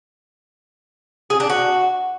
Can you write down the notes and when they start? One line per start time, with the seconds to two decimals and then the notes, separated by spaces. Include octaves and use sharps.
1.30 G#4
1.40 D4
1.50 F#4